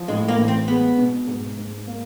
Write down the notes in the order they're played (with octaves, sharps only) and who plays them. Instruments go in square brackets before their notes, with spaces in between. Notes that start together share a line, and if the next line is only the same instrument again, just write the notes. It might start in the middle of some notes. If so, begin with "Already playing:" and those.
Already playing: [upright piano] F3
[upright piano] A2 [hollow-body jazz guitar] G#3
[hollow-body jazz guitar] A#3
[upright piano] A1
[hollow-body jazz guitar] C4
[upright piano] G#3 [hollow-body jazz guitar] B3
[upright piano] B2
G#2
G#2
A#3